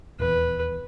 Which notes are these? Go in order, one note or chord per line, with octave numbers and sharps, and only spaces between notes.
D#1 E2 B4